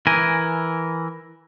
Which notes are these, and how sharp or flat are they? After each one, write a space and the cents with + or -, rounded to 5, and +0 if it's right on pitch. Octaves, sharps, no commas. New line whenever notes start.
E3 +0 A#4 +5 G#5 +0